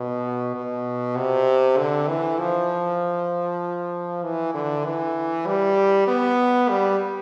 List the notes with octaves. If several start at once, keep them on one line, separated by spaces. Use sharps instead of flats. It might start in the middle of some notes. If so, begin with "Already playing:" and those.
Already playing: B2
B2
C3
D3
E3
F3
E3
D3
E3
G3
B3
G3